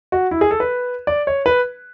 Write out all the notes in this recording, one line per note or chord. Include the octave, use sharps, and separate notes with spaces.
F#4
E4
G#4
A4
B4
D5
C#5
B4